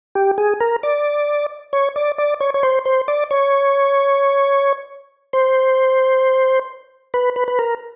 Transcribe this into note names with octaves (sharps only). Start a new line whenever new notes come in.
G4
G#4
A#4
D5
C#5
D5
D5
C#5
C#5
C5
C5
D5
C#5
C5
B4
B4
B4
A#4